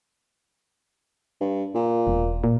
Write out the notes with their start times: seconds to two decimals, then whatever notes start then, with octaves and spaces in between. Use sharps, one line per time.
1.41 G2
1.75 A#2
2.07 E1
2.44 A#2